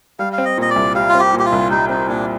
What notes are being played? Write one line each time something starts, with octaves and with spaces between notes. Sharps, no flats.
G3 F5
F5
C4
D#5
A#2 D#5
D5
C2
G3 F5
F4
C4
G4
A#2
G4
F4
C2
G3 D#4
C4 D#4
A#2 D4